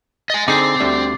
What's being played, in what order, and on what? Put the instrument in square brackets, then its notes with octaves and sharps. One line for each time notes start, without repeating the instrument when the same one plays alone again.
[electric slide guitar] D#5 G#5 [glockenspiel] A6
[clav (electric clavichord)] D3 D#4 G#4 [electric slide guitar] C4 [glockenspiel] D6 C7
[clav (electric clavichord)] D2 D3 G3